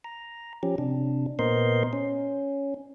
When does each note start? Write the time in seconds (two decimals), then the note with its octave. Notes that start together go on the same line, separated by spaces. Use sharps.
0.04 A#5
0.63 F3 C#4 G4
0.78 C3 D4
1.39 A#2 B3 A#4 C5 D#5 C6
1.93 C#4